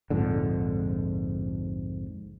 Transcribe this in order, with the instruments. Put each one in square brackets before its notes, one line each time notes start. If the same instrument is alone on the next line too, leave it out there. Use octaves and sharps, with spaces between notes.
[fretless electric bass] A#1 F2 G#2 D3